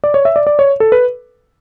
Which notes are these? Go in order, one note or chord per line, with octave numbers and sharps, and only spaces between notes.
D5
C#5
E5
D5
D5
C#5
A4
B4